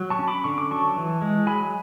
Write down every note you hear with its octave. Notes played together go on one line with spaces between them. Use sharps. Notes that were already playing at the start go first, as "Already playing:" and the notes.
Already playing: F#3
A5 C#6
C#4
B5 D6
D3 C#6
D6
F#3 A5 C#6
E3
G#3
F#3 G#5 B5